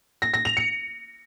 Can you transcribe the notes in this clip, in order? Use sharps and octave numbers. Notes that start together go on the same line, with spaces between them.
A#6
A#6
F7
C#7